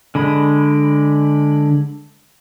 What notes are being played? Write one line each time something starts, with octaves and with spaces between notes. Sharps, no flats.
D3 G#3 B5